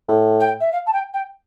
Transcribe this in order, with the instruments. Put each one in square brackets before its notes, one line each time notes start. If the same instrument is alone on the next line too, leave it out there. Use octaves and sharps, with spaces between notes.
[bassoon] A2
[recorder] G5
E5
F5
A5
G5
G5